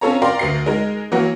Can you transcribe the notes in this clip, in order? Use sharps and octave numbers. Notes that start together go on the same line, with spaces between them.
C4 C#4 F4 A4 C#5 A#5
A#4 D5 F5 G5 A#5 C6
D2 A#4 C7
G#3 D#4 A#4
E3 F#3 A#3 F#4 A#4